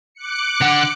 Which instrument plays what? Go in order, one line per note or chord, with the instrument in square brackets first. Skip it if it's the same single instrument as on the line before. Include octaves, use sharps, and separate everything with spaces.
[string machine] D6 F#6 C#7
[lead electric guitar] D3 F#5